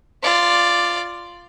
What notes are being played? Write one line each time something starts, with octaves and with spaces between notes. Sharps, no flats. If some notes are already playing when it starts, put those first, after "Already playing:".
F4 D5